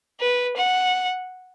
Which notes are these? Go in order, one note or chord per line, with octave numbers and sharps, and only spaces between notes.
B4
F#5